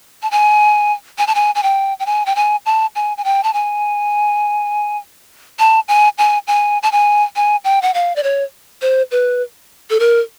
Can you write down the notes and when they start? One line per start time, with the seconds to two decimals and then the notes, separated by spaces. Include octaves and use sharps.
0.23 A5
0.31 G#5
1.18 G#5
1.27 A5
1.35 G#5
1.55 G#5
1.63 G5
1.99 G5
2.06 G#5
2.26 G5
2.36 G#5
2.66 A5
2.95 G#5
3.17 G#5
3.24 G5
3.44 A5
3.53 G#5
5.59 A5
5.88 G#5
6.18 G#5
6.47 G#5
6.83 A5
6.92 G#5
7.36 G#5
7.64 G5
7.82 F#5
7.94 F5
8.16 D5
8.23 C#5
8.82 C5
9.11 B4
9.90 A4
10.00 A#4